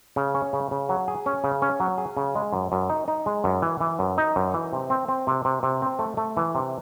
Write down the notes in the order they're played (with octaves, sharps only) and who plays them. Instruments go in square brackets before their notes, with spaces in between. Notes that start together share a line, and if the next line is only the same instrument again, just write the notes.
[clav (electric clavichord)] C#3
C#4
C#3
C#3
F#3
G#4
C#4
C#3
C#4
F#3
G#4
C#3
G#3
F#2
F#2
D#4
D#4
G#3
F#2
E3
E3
F#2
D#4
F#2
E3
C3
C4
C4
C3
C3
C3
C4
A3
A3
E3
C3